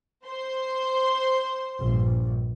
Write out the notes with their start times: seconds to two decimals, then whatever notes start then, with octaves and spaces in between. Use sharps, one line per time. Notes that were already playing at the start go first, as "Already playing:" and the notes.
0.25 C5 C6
1.79 A#1 G2